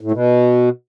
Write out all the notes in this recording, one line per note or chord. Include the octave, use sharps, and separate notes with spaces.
A2
B2